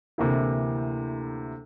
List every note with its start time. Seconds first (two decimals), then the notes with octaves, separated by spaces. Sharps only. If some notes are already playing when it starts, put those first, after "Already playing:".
0.18 D2 C3 E3 A#3 E4